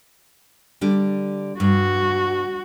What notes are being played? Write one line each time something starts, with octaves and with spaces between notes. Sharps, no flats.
D3 G3 D4
G2 F#4